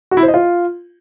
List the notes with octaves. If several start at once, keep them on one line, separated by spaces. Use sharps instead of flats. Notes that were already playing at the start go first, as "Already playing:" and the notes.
F#4
E4
C5
D#5
F4